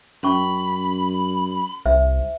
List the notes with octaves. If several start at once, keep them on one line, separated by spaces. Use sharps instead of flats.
F#2 C#4 B5 C#6
C2 C5 E5